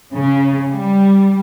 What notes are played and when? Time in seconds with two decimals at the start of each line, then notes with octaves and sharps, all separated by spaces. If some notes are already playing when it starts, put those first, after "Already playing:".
0.14 C#3
0.71 G3